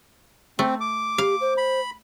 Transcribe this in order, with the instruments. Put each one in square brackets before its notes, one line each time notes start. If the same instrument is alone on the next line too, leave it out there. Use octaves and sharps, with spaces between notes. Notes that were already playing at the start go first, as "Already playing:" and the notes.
[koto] A3 [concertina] C4
[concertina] D6
[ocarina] G4 [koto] F5
[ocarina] C5
[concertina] B5